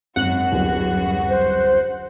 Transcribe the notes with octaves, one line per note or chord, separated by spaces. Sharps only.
G#1 F#2 F#4 F#5 F#6
D1 G1 G2
C5